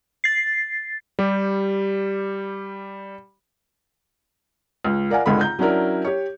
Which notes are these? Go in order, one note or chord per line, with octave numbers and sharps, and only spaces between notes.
A6 C7
G3 G4
C#2
A#4 D5 F5 F#5 G#5
G#1 C#2 D3 G#3 A3 B5
A#5 G6
F#3 C#4 D4 E4 A#4
G4 C#5